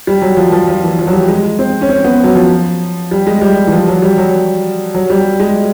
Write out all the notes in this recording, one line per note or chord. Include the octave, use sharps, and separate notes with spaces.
G3
F#3
F3
F3
F3
E3
F3
F#3
G3
G#3
C4
C#4
C4
B3
F#3
F3
G3
G#3
G3
E3
F3
F#3
G3
F#3
F#3
G3
G#3